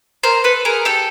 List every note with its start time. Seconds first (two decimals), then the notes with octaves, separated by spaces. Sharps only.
0.23 A#4 C5
0.44 A4 B4
0.65 G#4 A#4
0.85 G4 A4